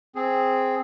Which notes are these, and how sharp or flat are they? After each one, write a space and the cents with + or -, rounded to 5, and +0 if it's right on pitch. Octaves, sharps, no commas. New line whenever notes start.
C4 +0 G#4 +0